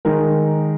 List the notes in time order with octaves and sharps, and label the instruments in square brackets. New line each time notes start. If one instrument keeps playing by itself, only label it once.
[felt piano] D#3 G#3 D#4 A#4